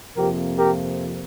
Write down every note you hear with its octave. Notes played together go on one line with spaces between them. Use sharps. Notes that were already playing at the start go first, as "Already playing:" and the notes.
F2 C3 F3 A#3 G4 A#4
G4 A#4